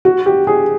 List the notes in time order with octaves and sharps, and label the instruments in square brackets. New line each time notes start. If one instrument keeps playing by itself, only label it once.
[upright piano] F#4
G4
G#4